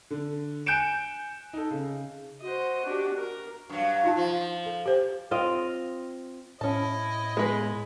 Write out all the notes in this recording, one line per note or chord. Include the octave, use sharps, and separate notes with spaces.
D3
G#5 F#6 G6 C#7 D7 E7
D#4 A4
C#3
F#4 C5 D#5
D4 G4
A#4
G2 F#3
D#4 F4 A5
F3
A4
G4 C5
C4 F4 D#5
A2 C#4 E4 D#5 A5
G#3 B3 B4